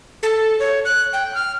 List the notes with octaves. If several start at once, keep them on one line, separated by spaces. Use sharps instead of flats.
A4
C#5
F#6
G5
F6